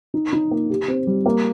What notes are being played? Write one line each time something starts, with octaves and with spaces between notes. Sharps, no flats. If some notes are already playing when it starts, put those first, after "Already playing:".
D#4
D#4
A#3
G4
C4
G3
A#3